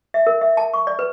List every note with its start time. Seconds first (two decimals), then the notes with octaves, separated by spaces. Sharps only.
0.14 E5
0.27 A#4
0.41 E5
0.57 A5
0.74 C#6
0.87 D5
0.99 B4